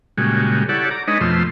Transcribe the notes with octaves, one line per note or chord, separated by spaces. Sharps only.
A#2 C#3 G3 G#3 F#4
E4 G4 A4 C#5 D5 F#5
A#5 D6
G#3 D4 D#4 B4 C#5 D#5
F2 B2 F3 A3 C6 E6